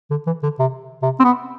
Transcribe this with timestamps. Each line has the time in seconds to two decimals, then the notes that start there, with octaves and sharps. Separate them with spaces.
0.10 D3
0.27 E3
0.43 D3
0.59 C3
1.02 C3
1.20 C4
1.24 B3